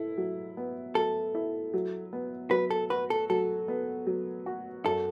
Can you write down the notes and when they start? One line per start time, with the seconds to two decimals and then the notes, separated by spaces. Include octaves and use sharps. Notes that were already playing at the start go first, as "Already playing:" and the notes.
Already playing: E4 A4
0.18 F#3
0.57 B3
0.95 F#3 A4
1.35 E4
1.74 F#3
2.13 B3
2.51 F#3 B4
2.70 A4
2.90 F#4 B4
3.10 A4
3.30 F#3 A4
3.68 B3
4.07 F#3
4.46 F#4
4.85 F#2 A4